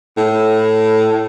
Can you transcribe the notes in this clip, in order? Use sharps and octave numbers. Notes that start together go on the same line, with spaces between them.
A2